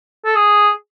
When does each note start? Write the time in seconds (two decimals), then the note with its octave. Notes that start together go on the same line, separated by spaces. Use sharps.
0.25 A4
0.35 G#4